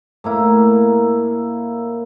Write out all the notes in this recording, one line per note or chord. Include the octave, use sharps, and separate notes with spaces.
A2 A#3 E4